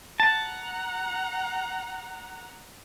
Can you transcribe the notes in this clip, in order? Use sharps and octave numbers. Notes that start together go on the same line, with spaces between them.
F#5 A5 A#5